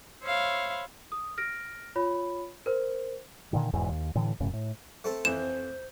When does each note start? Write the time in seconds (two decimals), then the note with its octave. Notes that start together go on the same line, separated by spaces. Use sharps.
0.23 C5 C#5 E5 F5 B5
1.12 D#6
1.38 F6 A#6 D7
1.96 F4 C#5 B5
2.66 A#4 C5
3.53 A#2 D3 D#3
3.73 E1 E2 G#2 E3
3.90 D#2
4.15 A2 D3 E3 A3
4.40 E1 F#2 A2 C#3
4.53 A2
5.04 A3 C4 A4
5.25 F2 E3 C5 E7